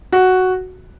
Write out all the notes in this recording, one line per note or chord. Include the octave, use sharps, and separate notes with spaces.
F#4